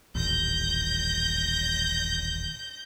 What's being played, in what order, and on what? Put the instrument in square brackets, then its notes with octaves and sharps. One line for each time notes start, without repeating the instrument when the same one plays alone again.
[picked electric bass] D#1 A1 [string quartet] G6 A#6